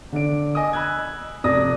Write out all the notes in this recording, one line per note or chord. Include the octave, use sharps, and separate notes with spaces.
D3 D4 D7
D#5 G#5 D#6
B5 E6 F#6 G#6
F1 D5 D#6 A#6